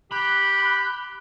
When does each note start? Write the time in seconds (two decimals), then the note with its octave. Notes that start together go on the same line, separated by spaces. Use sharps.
0.11 G4 B5 F#6